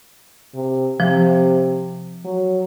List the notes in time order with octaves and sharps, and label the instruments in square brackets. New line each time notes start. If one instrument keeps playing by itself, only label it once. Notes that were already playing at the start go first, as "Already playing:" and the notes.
[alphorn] C3
[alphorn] C3 [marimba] F3
[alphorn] F#3